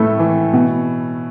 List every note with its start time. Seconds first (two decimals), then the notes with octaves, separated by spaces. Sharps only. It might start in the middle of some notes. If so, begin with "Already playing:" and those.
Already playing: A2 A3 E4 A4 B4
0.19 E3
0.53 B2